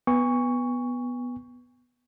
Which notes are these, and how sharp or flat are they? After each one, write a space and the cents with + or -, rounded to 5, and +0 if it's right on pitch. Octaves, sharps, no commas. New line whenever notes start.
B3 +0 G#5 -35 C#6 +10